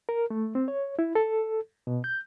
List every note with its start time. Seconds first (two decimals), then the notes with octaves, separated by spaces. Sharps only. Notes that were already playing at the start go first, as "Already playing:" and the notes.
0.09 A#4
0.30 A3
0.55 C4
0.68 C#5
0.99 E4
1.15 A4
1.87 B2
2.04 G6